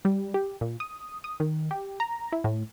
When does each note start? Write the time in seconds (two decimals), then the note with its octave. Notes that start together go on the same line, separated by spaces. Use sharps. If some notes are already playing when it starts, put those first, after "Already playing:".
0.05 G3
0.34 G4
0.61 A#2
0.80 D#6
1.24 D#6
1.40 D#3
1.71 G4
2.00 A#5
2.32 E4
2.44 A2